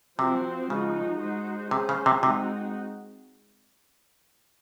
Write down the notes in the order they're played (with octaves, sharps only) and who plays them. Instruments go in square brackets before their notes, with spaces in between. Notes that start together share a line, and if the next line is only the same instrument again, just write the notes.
[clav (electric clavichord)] C3 [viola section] F3 C4 F#4 C5
[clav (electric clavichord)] C#3 [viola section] F3 G#3 D#4 F#4
[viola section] G#3 D#4 F#4 C5
[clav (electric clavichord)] C3 [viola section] C#4 G#4 C5
[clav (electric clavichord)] C#3
C3
[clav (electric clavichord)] C3 [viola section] G#3 C4 D#4 F#4